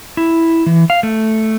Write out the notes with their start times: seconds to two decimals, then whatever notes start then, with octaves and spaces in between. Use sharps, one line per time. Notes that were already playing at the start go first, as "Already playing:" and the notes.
0.17 E4
0.66 E3
0.90 F5
1.03 A3